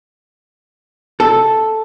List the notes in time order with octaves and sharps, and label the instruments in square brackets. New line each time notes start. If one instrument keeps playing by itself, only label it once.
[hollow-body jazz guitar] A4